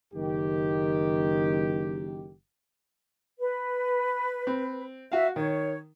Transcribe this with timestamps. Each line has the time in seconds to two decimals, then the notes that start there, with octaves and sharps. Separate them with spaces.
0.13 F#1 D#3 G4
3.39 B4
4.47 C4
5.12 F#4 E5 F5
5.36 D#3 C#5